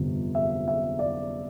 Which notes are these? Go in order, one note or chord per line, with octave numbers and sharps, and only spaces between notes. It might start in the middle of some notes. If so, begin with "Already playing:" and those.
Already playing: G1 F2 C3 G3
E5
E5
D5